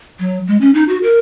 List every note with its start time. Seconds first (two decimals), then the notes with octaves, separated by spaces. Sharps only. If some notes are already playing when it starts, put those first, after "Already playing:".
0.19 F#3
0.47 G#3
0.61 C#4
0.74 D#4
0.89 F#4
1.03 A#4